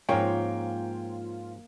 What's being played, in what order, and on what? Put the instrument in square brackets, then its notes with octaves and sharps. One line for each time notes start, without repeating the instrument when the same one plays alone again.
[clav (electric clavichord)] G#2 F3 C#4 [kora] A#3 [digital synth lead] F4 [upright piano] C#5 G5